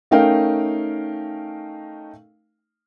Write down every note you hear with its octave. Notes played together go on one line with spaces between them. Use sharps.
A3 C#4 D#4 A#4 F5 G5